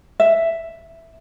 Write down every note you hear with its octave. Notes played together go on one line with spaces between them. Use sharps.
E5